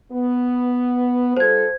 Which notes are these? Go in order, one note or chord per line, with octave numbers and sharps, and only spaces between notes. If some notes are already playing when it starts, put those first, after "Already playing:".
B3
G3 F4 A4 C5 G#6